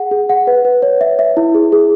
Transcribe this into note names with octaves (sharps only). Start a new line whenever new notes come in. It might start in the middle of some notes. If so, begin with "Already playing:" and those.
Already playing: G#4 F#5
G#4
F#5
B4
B4
C#5
E5
E5
E4
G#4
G#4